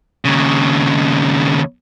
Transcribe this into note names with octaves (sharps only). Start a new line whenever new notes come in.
D#2 C#3